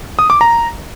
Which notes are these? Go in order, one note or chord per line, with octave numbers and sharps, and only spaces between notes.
D#6
D6
A#5